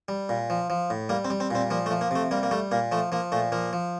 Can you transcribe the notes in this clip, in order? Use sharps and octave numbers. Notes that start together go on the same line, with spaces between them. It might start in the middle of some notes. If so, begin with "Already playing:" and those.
G3
A#2
F3
F3
A2
G3 A#3
C4
G3
C4
A#2 C4
F3 A#3
A3
F3
A#3
C3 A3
G3 A#3
A#3
G3 A3
A#2 A#3
F3 A3
F3 A#3
A#2 A3
F3 A#3
F3